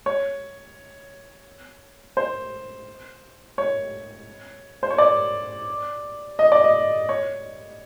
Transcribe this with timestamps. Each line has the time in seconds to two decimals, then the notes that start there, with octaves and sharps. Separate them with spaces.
0.06 C#5
2.17 C5
3.58 C#5
4.83 C5
4.90 C#5
4.98 D5
6.39 D#5
6.52 D5
6.64 D#5
7.09 C#5